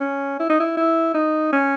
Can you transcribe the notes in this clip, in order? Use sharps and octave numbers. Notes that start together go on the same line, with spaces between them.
C#4
E4
D#4
E4
E4
D#4
C#4